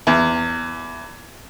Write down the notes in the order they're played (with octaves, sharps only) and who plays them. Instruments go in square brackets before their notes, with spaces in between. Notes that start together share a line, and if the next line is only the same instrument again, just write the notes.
[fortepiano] E2